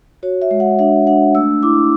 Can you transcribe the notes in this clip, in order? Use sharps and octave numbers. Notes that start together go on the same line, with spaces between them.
F#4 C#5
E5
G#3
F#5
D4 E5
D4 F#5
A3 E6
E4 D6